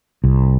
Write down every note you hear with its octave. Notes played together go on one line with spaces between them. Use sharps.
C2